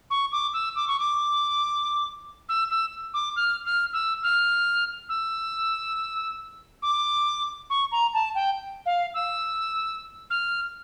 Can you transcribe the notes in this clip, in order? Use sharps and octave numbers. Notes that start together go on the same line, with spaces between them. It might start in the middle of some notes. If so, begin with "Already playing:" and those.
C#6
D6
E6
D6
C#6
D6
E6
E6
D6
F6
F6
E6
F6
E6
D6
C#6
A#5
A5
G5
F5
E6
F6